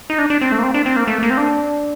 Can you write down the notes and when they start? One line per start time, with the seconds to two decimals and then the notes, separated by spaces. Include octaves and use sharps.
0.10 D#4
0.18 D4
0.30 D4
0.41 C4
0.52 A3
0.59 A#3
0.63 C4
0.74 D4
0.86 C4
0.96 A#3
1.08 A3
1.23 A#3
1.30 C4
1.37 D4